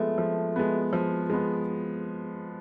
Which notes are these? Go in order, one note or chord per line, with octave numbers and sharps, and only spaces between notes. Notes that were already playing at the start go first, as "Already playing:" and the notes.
Already playing: F3 G#3 A3 B3
F3
G#3 B3
F3
G#3 B3